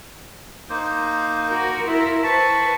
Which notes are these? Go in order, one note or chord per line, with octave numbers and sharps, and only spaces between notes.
A#3 D#4 C5
F#4 A#4
E4 F4 A#4
B4 C5 A5 C#6